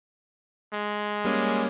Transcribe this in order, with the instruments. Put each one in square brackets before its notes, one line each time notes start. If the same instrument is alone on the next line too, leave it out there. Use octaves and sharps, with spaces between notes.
[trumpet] G#3
[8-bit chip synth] G3 A#3 C#4